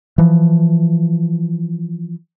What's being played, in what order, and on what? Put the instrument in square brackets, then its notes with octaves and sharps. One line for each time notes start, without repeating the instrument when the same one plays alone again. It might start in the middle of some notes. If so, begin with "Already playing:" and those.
[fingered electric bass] E3 F3